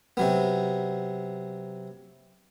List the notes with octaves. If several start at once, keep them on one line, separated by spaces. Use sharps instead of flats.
C3 F#3 B3